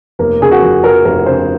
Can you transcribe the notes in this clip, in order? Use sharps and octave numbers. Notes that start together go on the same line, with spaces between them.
F1 A#3
C#3 G#4
F#4
F2
F3 A#4
F1 A#4
C#3 C5